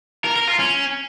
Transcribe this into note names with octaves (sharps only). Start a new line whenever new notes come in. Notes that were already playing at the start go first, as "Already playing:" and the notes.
A#4
A#4
F4
C#4